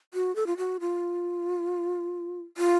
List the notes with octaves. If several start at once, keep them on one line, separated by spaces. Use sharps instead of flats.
F#4
A4
F4
F#4
F4
F4